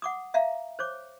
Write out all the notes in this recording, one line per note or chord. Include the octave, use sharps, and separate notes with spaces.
F#5 D6 D#6
E5 F5 A#5
C5 C#5 D6